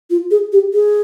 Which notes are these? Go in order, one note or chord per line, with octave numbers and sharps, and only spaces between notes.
F4
G#4
G4
G#4